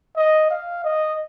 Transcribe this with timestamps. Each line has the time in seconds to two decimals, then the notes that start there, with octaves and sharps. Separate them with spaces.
0.17 D#5
0.50 F5
0.84 D#5